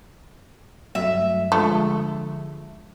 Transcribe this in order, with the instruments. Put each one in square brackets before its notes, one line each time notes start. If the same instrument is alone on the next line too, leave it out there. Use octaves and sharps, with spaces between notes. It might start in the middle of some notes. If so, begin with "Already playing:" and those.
[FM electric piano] G2 F#3 A3 [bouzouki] E5
[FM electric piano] D3 F3 G#3 [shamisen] A3